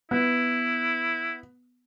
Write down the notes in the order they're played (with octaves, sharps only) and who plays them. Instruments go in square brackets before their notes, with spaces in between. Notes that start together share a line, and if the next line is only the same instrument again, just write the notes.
[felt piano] B3 [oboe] E4